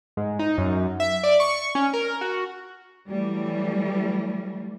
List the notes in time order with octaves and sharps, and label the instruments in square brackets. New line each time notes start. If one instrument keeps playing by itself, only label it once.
[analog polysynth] G#2
D#4
F#2
E5
D5
C#6
C#4
A#4
F#4
[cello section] E3 F#3 G3 A3